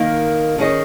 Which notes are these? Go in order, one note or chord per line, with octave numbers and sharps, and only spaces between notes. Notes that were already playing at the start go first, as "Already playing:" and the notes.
Already playing: D#3 A#3 D#4
D#3 C#4 G#4 D#5